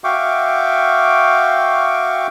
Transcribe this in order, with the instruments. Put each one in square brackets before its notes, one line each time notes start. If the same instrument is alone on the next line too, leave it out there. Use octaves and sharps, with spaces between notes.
[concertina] F#4 E5 F5 G5 C#6 D6